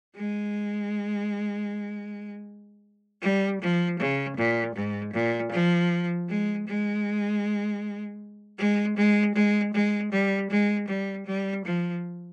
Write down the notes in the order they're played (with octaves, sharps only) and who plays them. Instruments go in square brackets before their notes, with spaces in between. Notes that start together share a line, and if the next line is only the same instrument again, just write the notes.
[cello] G#3
G3
F3
C#3
A#2
G#2
A#2
F3
G#3
G#3
G#3
G#3
G#3
G#3
G3
G#3
G3
G3
F3